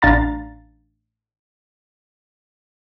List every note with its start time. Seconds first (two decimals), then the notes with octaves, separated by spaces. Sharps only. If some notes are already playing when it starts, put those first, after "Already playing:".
0.02 A1 D4 F5 A#5 A6